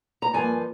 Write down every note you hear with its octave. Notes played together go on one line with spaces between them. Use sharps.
A#5
G2 F3 A#3 G#5